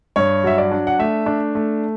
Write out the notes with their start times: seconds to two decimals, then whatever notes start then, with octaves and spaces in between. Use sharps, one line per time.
0.16 G2 C#5
0.44 F#3 E5
0.58 D5
0.72 D4
0.87 F#5
0.99 A3 E5
1.26 D4
1.55 A3